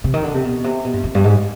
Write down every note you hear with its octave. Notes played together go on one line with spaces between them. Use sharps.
C3
D#3
D3
C3
B2
C3
B2
G2
F2
G2
G#2